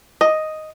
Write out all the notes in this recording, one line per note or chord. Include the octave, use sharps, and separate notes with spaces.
D#5